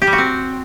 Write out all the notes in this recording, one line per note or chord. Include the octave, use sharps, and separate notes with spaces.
G4
G3
F#4
C4